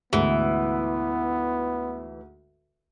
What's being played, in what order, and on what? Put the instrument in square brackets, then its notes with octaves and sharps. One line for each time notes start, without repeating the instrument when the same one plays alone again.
[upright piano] D2 G#2 D3 [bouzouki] E3 [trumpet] B3